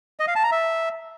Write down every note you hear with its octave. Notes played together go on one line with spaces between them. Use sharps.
D#5
F5
A5
A#5
E5